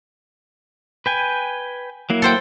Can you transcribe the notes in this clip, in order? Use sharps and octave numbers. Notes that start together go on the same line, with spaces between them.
B4 G5 G#5
F#3 A#3 E4
A4 C5 G5